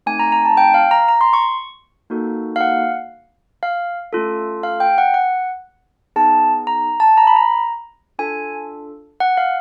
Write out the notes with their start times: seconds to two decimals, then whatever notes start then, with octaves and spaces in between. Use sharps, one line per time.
0.06 A3 C4 D#4 G#5
0.19 A#5
0.32 A#5
0.45 A5
0.57 G5
0.74 F5
0.91 A#5
1.08 A#5
1.21 C6
1.33 C#6
2.10 A#3 D#4 F#4 A4
2.56 F5
2.61 F#5
3.63 F5
4.13 A3 C#4 F4 A4
4.63 F5
4.80 G5
4.98 F#5
5.14 F#5
6.16 B3 D#4 G#4 A5
6.67 A#5
7.00 A5
7.18 A#5
7.27 B5
7.36 A#5
8.19 D4 F4 A4 G#5
9.20 F#5
9.37 F5